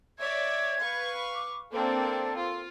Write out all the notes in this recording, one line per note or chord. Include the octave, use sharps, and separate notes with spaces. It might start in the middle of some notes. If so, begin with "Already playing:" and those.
C#5 D5 E5 G#6
B4 F5 C#6
D6
A#3 C4 D4 A4
F4